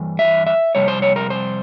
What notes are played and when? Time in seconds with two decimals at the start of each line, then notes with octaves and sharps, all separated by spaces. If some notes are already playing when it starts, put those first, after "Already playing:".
Already playing: G2 E3
0.19 E5
0.46 E5
0.75 F2 C3 G3 C#5
0.88 C5
1.02 C#5
1.16 A#4
1.30 C5